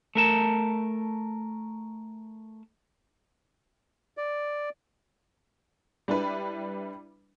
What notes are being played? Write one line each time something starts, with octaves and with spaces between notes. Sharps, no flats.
A3 A#4 A5
D5
G3 D4 E4 B4